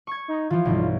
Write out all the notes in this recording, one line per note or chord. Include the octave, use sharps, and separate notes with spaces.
C#6 G#6
D#4
E3 F3 F4
B1 G2 E3